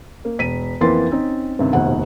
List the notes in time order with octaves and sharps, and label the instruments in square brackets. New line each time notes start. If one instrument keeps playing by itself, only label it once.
[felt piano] A#3
E1 B6 D#7
F2 E3 A#3 B3 C6 A6
C4 C#4 D#4
G2 C3 D#3
F1 A#1 D#2 B2 F#5